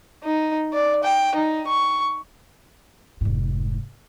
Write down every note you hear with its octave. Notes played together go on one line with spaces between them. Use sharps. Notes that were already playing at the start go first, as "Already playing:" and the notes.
D#4
D5
G5
D#4
C#6
F1 G#2